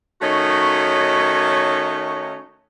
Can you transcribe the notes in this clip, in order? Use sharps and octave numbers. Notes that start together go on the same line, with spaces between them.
D#3 A3 C#4 D#4 F#4 C#5